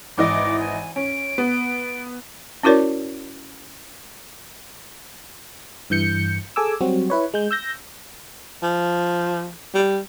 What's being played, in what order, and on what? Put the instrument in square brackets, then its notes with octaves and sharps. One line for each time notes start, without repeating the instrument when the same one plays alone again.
[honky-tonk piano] G#1 E3 D#5 [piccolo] D6
[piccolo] G#5
[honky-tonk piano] C#4 [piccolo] D7
[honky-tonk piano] B3
[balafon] C#4 E4 F#4 A#4 C#5 D5
[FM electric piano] G2 E3 G6 C#7
G#4 A4 G#5 D6 E6
F#3 G3 C4 F#4
E4 B4 C#5
G#3 G6
E6 G6 A#6
[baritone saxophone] F3
G3